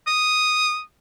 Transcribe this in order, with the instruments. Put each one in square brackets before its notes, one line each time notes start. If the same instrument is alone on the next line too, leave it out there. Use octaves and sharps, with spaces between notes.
[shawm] D#6